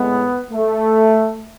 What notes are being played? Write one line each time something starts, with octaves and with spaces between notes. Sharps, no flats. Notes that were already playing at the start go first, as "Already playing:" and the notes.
Already playing: A2 G#3 B3
A3